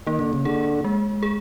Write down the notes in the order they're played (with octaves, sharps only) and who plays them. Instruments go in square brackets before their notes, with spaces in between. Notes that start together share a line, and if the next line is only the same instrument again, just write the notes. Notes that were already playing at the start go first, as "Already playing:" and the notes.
[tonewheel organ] D#3 [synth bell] A#3
[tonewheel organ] D3
C#3
[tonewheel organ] D3 [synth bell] G#4
[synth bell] G#3
G#4